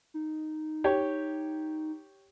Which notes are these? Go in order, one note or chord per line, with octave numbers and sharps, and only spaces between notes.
D#4
G4 C#5